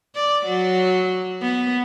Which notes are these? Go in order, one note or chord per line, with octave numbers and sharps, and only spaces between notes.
D5
F#3
B3